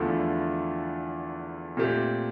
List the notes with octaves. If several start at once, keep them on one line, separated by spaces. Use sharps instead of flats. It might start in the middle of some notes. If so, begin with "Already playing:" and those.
Already playing: E2 D3 F3 A3 E4
A#2 A3 C4 G4